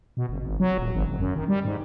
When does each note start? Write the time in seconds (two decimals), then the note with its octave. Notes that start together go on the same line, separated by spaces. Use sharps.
0.17 B2
0.29 F#1
0.43 G#1
0.60 F#3
0.78 D#1
0.93 G#1
1.07 F#1
1.19 F#2
1.36 D#3
1.48 G3
1.65 G#2